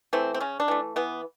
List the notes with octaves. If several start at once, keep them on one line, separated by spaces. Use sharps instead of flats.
E3 A3 C4
C4
C#3 C#4
D4
E3 A3
E3 B3